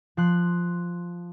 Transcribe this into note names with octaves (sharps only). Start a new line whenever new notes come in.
F3 C6 F#6